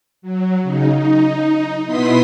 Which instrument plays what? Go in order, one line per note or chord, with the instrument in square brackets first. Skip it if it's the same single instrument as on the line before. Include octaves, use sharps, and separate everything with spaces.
[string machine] F#3
C#3 D#4
D#4
B2 B3 E4 C6 D#6 B6